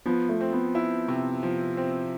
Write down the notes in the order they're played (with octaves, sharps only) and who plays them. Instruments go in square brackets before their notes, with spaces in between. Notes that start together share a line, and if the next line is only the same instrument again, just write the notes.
[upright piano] F3 [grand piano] B3
[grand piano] A3
[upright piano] C4
[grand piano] B3
[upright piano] E4
C3
F3
C4